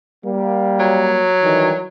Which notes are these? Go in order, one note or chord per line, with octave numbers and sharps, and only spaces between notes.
G3 A#3
F#3
D#3 E3 G3